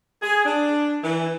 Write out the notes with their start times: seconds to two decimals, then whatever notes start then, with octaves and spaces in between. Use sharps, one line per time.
0.22 G#4
0.45 D4
1.04 E3